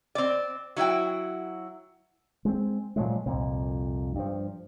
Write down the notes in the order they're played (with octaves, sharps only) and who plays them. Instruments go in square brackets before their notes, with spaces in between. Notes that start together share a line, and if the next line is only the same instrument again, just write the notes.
[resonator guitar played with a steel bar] C4 D5
F#3 E4 F#4 G5
[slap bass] G#3 C4
A#2 F3 F#3 G#3
C2 F2 A#2
G2 F3